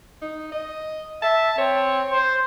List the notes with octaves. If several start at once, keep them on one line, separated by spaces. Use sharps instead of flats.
D#4
D#5
E5 A5
C4 C#5
C5